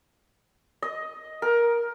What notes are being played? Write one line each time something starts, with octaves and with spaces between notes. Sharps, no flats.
D#5
A#4